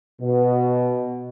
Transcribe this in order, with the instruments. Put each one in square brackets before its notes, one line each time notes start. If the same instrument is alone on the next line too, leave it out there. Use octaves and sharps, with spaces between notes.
[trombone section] B2